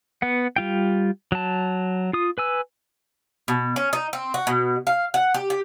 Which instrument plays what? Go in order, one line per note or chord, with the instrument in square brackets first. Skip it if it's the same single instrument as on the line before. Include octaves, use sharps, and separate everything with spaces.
[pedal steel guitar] B3 F#5
G3 F4 G5
F#3 A5
F4 D#6
B4 G#5 E6
[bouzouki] B2
C#4
D#4
C4
F#4
B2
F5
F#5
G4
G4